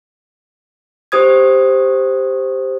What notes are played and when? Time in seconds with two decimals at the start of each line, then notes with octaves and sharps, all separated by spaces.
1.12 G4 C5 D#6 G#6